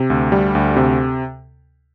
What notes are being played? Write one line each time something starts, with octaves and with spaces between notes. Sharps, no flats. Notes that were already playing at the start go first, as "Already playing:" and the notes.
Already playing: C3
D2
G3
D2
C3